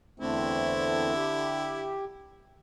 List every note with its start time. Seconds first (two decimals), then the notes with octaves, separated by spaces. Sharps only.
0.20 E2 D3 A3 C4 E4
1.16 G4